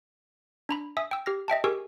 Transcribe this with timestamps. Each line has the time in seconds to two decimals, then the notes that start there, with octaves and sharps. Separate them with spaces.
0.69 D4 A#5 B5
0.97 E5 G#5 D#6 E6
1.11 G5 E6
1.26 G4 F6 A#6
1.48 D#5 E5 G5 A5
1.64 G4 G#4 A#4 G#5 C#6 E6